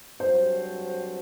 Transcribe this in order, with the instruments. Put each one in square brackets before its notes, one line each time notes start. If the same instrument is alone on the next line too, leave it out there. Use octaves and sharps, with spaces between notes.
[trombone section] G2 F#3 C4 F#4 A4 [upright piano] C5